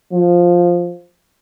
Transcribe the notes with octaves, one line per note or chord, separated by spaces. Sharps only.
F3